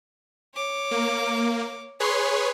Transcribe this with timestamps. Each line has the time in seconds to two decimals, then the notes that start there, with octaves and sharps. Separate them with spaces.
0.55 C#5 D6
0.91 A#3
2.00 G#4 B4 C#5 C6